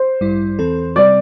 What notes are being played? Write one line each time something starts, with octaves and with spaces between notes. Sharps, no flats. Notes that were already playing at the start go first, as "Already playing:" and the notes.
Already playing: C5
A1 G2 G3 E4
E2 E3 C4 A4
C3 G3 C4 D5